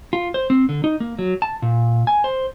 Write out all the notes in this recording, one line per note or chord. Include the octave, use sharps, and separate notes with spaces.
F4
C5
C4
D3
D#4
A#3
F#3
A5
A#2
G#5
C5